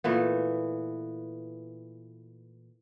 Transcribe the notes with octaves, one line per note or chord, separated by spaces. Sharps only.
A#2 E3 A3 B3